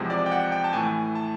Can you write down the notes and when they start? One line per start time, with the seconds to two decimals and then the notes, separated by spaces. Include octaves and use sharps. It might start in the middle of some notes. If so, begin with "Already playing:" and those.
Already playing: E2 C3 F3 G#3
0.10 D5
0.26 G5
0.32 F#5
0.52 G5
0.64 A5
0.73 A2 E3 A3 G#5
1.15 A5